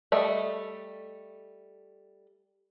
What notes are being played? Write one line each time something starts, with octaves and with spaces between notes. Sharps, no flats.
G3 A3 D#5